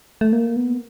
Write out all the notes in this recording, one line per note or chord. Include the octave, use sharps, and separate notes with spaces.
A3
A#3
B3